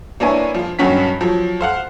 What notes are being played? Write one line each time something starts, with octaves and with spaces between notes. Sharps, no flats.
A#3 B3 D4 E4 C#5 G#5
F3 F4
G2 D#3 F#3 C#4 F#5 B6
F3 F#3
C5 F5 F#5